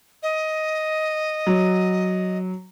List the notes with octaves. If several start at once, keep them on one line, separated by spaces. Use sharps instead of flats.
D#5
F#3